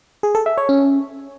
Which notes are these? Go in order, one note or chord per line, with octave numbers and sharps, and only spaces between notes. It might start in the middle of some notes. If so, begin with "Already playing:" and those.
G#4
A4
E5
C#5
C#4